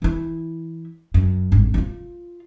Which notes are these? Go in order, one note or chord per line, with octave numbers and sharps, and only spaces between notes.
E3 E4
F#2
G#1 G2
D3 F4